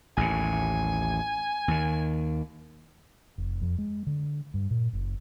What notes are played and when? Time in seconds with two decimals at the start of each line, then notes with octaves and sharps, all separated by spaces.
0.17 A1 D#2 A2 G#5
1.68 D#2 D#3
3.38 F1
3.62 F2
3.78 G#3
4.07 D3
4.54 G2
4.71 A#2
4.93 F#1